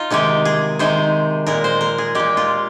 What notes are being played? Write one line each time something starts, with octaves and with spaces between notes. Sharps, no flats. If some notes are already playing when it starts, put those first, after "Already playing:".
Already playing: D#4 F4
C3 D#3 G#3 G4
G#4
C3 D#3 G#3 C5
A#2 G#3 A#4
C5
A#4
G#4
A#2 G#3 G4
F4